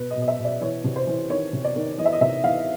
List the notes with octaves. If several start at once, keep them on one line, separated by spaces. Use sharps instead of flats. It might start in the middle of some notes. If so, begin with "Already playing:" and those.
Already playing: B2 B4
D#5
B2
D#5
E5
B2
D5
E3 C#5
C3
C5
E3
D#3 C#5
C3
D5
D#3
E3 D#5
E5
D#5
C3 E5
E3 F5